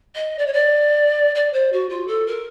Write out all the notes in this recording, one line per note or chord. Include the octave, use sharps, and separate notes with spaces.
D#5
D5
C#5
D5
D5
C5
F#4
F4
A4
A#4